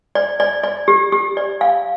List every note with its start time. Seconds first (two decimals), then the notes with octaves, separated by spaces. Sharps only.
0.15 D5
0.40 D5
0.63 D5
0.88 G4
1.12 G4
1.37 D5
1.61 F5